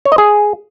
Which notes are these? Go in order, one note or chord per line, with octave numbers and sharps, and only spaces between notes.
C#5
D#5
G#4